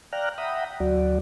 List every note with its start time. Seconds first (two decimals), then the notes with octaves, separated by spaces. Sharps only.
0.13 D5 F5 G5 A#5 F6 F#6
0.38 E5 F#5 G5 A#5 B5 D#6
0.80 D2 F#3 F#4 D5